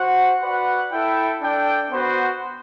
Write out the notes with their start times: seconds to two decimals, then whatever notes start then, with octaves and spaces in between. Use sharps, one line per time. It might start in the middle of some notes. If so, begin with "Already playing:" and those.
Already playing: F#4 C5 F#5
0.41 F#4 B4 D5 F#5
0.91 E4 A4 E5 G5
1.41 D4 A4 D5 G5
1.90 B3 F#4 C5